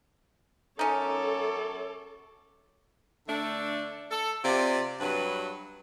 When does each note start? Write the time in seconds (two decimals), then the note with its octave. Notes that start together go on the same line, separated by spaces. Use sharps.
0.79 F#2 C#4 D#4 A4 C#5 D6
3.28 D3 A3 D4
4.11 A4
4.43 C3 F4 D5
5.00 G2 F#3 B4